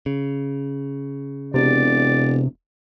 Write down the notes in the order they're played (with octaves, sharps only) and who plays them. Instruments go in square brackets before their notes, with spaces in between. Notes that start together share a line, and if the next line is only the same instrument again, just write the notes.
[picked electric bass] C#3
[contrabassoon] E1 [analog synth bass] C3 [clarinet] D5